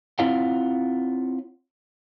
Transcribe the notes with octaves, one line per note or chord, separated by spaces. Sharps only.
C4 E4 F4 C#5 F5 F#5